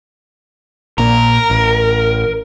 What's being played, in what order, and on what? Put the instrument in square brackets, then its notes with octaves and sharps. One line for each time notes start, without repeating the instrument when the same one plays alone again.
[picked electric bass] A#1 A#2 [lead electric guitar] A#4
[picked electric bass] A1